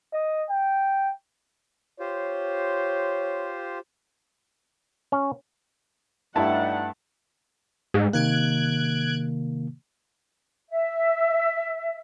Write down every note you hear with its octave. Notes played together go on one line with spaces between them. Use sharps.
D#5
G5
F4 G4 C5 C#5
C#4
G2 G3 A3 D#4 E4 F#5 A5
G#2
C3 D#3 A#3 F#6 G#6 D7
E5